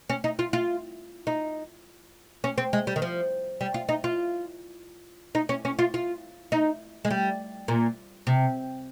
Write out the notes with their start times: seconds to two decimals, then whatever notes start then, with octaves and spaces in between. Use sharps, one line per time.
0.10 C#4
0.24 D#4
0.39 F4
0.53 F4
1.27 D#4
2.44 C#4
2.58 C4
2.73 G#3
2.87 G3
2.96 D#3
3.02 F3
3.61 G3
3.74 F4
3.89 D#4
4.04 F4
5.35 D#4
5.49 C#4
5.65 C#4
5.79 F4
5.94 F4
6.52 D#4
7.05 G#3
7.11 G3
7.68 A#2
8.27 C3